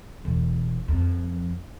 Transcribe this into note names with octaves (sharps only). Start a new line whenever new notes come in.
E1
F2